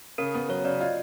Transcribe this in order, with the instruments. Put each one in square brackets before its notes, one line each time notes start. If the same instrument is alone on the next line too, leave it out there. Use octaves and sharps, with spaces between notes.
[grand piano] C#3 [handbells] A#4
[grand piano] B3
[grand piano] F#3 [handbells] C#5
[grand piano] C#3 [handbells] D5
[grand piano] F4 [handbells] D#5